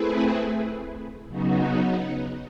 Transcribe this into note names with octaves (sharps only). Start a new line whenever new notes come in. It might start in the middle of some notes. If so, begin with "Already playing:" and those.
Already playing: A3 C4 E4 G#4 B4
C#3 F#3 B3 D#4 F#4